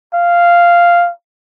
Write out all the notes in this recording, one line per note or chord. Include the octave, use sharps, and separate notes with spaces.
F5